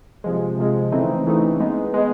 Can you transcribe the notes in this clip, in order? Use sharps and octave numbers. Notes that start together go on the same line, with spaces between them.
C3 F3 G#3
C3 F3 G#3
C#3 E3 A3 C4 D#4
C#3 E3 A3 C4 D#4
G#3 B3 D#4
G#3 B3 D#4